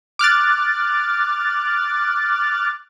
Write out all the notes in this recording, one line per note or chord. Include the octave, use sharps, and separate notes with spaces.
D6 F6 F#6 A6